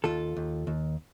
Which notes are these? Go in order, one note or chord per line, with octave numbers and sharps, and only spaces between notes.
D#2 F4 A4
D#2
D#2